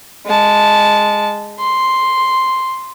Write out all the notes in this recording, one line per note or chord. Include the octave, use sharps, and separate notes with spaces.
G#3 A5
C6